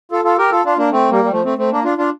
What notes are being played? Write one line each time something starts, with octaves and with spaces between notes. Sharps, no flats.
F4 A4
F4 A4
G4 A#4
F4 A4
D4 F4
A#3 D4
A3 C4
G3 A#3
G3
F3 A3
A3 C4
A3 C4
A#3 D4
D4 F4
D4 F4